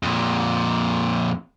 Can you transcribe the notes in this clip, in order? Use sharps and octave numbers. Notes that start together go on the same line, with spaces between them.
F2 A#2